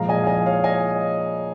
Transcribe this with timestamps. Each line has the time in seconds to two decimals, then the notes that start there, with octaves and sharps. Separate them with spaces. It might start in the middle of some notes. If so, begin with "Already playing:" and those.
Already playing: A#2 F3 G#3 F5 A#5
0.09 D#5 G#5
0.23 F5
0.27 D#5 G#5
0.46 C#5 F5
0.64 D#5 G#5